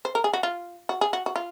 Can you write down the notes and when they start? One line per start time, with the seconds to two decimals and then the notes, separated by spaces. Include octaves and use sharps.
0.05 C5
0.15 A#4
0.24 G#4
0.33 F#4
0.43 F4
0.89 F#4
1.01 G#4
1.13 F#4
1.26 F#4
1.36 F4